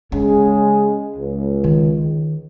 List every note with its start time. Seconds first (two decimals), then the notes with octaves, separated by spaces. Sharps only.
0.12 C#3 G#3 C#4 G#4
1.16 C#2
1.64 D#3